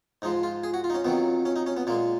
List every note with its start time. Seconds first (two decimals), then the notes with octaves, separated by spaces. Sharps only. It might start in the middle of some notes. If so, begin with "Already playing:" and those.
0.22 G#2 F3 G#3 D#4
0.43 F4
0.64 G#4
0.74 F#4
0.84 F4
0.90 D#4
0.94 C#4
1.05 F2 D#3 F#3 B3
1.45 C#4
1.56 D#4
1.67 C#4
1.77 B3
1.87 A#2 G#3 A#3